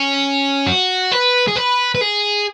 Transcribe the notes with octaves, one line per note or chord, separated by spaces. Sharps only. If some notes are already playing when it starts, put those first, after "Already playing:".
Already playing: C#4
F#4
B4
G#4
B4
B4
G#4